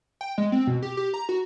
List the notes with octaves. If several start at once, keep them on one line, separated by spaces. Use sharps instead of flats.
G5
G#3
C4
B2
G4
G4
A#5
F#4